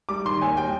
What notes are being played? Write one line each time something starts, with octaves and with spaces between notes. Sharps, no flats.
G3 D6
D#3 C6
D#2 G#5
G3 G5